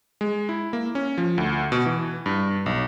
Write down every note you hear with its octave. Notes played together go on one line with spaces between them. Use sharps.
G#3
E4
A#3
C#4
F3
D2
B2
E3
G2
B1